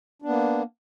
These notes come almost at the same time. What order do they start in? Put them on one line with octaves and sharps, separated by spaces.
D4 B3 A#3